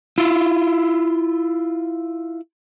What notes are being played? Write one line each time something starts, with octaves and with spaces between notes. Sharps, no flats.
E4 F4